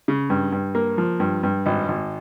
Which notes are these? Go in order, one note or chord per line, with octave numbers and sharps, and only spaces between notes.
C#3
G2
G2
A#3
F3
G2
G2
G#1
G#1